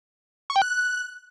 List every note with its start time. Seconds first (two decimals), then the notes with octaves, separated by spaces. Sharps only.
0.50 C#6
0.56 G5
0.62 F#6